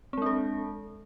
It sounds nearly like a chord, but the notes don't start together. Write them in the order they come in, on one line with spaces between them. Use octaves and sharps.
C4 G#3 D4 A4